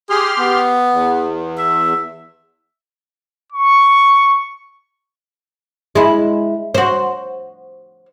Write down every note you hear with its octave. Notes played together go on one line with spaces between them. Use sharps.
G4 G#4 C6 F6
B3
E2
E5
C#6
G#3 E4
F#4 C5